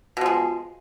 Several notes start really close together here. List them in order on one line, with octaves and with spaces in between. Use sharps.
B2 F3 G#3